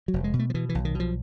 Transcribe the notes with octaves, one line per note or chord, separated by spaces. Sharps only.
F#3
F1
G#3
B2
A3
F3
B2 E3
E3
B1
D#3
B2 F3